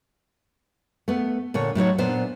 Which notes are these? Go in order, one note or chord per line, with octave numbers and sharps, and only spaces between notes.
A3 B3
A#2 D3 C#5
A2 F#3 D#4 C#5
A#2 B3 D4 C5